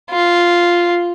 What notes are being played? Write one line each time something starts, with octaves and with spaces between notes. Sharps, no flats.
F4